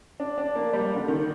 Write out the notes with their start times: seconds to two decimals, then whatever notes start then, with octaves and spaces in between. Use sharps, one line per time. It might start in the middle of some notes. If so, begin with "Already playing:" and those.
0.20 D4
0.38 D4
0.55 A#3
0.73 G3
0.96 D3
1.08 D#3